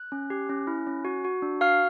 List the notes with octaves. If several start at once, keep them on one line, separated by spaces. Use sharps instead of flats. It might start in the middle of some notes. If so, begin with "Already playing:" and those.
Already playing: F#6
C#4
G4
C#4
E4
C#4
F#4
F#4
D4
F#4 F5 F6